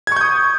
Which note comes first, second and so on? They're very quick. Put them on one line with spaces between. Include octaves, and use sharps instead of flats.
G#6 C#6 G6 D#6